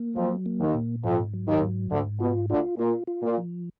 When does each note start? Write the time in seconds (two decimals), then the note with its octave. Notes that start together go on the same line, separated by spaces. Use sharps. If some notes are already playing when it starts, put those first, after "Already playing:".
Already playing: A#3
0.16 F2 F3 F#3
0.46 A#3
0.60 D#2 D#3
0.74 A#2
1.04 F2 G#2 F3
1.34 F#3
1.48 D#2 D#3
1.62 G#2
1.91 D2 G#2 D3
2.20 B2 F4
2.49 D2 D3 F4
2.78 A#2 F4
3.07 F4
3.23 A#2
3.38 F3